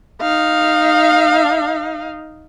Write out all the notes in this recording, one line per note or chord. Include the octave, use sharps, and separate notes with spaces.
D#4 F5